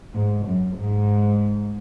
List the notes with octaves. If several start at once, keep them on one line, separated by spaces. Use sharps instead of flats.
G#2
F#2
G#2